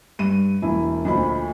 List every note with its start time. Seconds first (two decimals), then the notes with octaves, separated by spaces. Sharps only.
0.19 G2 D#7
0.62 E1 A#3 E4
1.05 D2 A#2 F3 D#5 B5